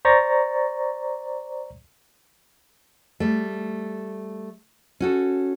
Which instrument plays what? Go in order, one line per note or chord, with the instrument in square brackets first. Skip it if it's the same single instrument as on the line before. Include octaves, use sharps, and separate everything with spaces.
[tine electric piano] C5 D5 A#5 C#6 A6 A#6
[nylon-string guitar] G3 A3
C#4 F#4 A4